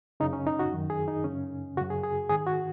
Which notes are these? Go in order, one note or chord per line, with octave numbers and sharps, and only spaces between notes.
F#2 C#3 D#4
C#4
D#4
F#4
F#2 D#3
G#4
D#4
F#2 C#3 C#4
F#2 C#3 F#4
G#4
G#4
G#2 D#3 G#4
F#4